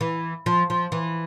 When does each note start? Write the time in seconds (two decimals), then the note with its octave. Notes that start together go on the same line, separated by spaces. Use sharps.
0.01 E3
0.46 F3
0.70 F3
0.92 E3